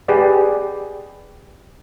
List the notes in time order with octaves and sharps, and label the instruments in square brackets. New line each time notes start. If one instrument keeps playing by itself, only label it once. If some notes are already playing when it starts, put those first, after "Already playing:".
[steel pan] G4 G#4 B4 D5 D#5